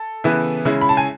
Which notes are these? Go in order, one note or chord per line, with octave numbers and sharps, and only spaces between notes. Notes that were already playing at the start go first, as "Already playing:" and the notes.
Already playing: A4
C#3 E3 B3 E4
C#3 G#3 C#4 E4
B5
A5
G#5